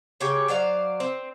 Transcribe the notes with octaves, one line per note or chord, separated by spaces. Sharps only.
C#3 G4 C#5 G5
F#3 C5 D5 F5
C4